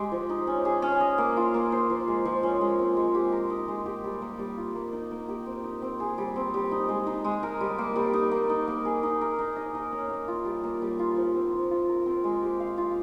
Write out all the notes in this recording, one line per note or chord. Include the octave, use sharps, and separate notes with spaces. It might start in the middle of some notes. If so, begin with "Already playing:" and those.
Already playing: G#3 G4
F3
D#4
C#4
G#4
C#4
D#5
A#3
F4
A#3
C5
F3
G#3
F3
C#4
G#3
C4
G#3
G4
A#4
D#4
G#3
G4
G3
A#3
G3
F4
A#3
D#4
A#3
G4
C4
D#4
C4
G#4
G3
C4
G3
D#4
G#3
D#4
G#3
A#4
G3
A#3
G3
D#4
A#3
D#4
A#3
G#4
D#4
A#4
D#4
D#5
A#4
C#4
A#3
F4
G3
A#3
G3
F4
F3
C4
F3
F4
A#4
C4
G#3
G4
F5
F4